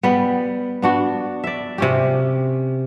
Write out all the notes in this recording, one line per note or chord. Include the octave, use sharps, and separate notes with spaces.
G3 B3
B3 D4 F#4
D5 E5
C3 C#4 G4